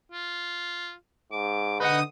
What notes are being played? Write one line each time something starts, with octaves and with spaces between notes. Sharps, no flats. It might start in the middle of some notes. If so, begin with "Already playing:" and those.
F4
G#2 D6
D3 D#4 B4 D#5 F#5 D#6